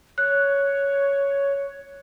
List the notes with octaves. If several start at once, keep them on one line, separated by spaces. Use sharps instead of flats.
C#5 F#6